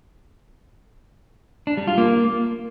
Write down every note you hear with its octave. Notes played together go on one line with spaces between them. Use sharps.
D4
G3
F4
A#3